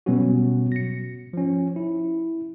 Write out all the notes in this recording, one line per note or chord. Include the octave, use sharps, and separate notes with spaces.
B2 F#3 G3 B3 C#4 F#4
A#6 C#7
F3 C#4
E4